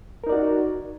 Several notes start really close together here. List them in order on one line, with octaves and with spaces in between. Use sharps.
A#4 D#4 D5 F#4